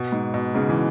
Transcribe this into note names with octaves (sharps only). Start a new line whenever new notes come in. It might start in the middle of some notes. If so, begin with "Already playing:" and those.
Already playing: B2
G#2
B2
G#2 C#3
E3